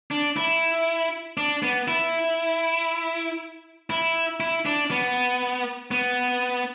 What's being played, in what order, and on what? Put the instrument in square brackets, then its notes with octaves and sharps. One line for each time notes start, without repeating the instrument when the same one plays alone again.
[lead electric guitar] D4
E4
D4
B3
E4
E4
E4
D4
B3
B3